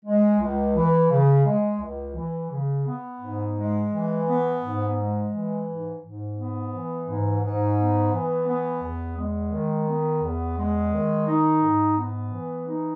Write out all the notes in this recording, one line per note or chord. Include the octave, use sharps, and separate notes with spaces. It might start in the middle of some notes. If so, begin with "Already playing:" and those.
G#3
C#2
E3
C#3
G#3
C#2
E3
C#3
B3
G#2
G#3
E3
B3
G#2
G#3
E3
G#2
G#2
B3
E3
G#2
G#2
B3
E3
B3
E2
G#3
D#3
B3
E2
G#3
D#3
D#4
G#2
B3
E3
D#4